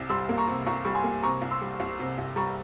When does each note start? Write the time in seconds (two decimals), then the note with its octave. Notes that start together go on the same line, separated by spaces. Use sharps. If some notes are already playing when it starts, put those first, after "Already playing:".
Already playing: C2 C3
0.09 G3 C6 E6
0.29 A#3
0.38 A#5 C#6
0.48 C3
0.66 C2 A#5 C#6
0.85 G3 C#6
0.94 G#5 C6
1.04 A#3
1.23 C3 A#5 C#6
1.42 C2
1.51 C6 E6
1.61 G3
1.80 C2
1.99 C3
2.18 C2
2.36 G3 A#5 C#6